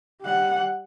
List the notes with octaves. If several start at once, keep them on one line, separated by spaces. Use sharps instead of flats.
G3 F#5